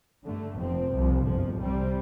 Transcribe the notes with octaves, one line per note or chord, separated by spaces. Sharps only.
G2 D3 A3
F1 F2 F3 C4
C2 C3 F3
G1 F2 F3
C2 C3 G3 C4